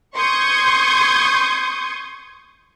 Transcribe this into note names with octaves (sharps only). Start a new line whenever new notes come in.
C6 C#6 D#6 G6 G#6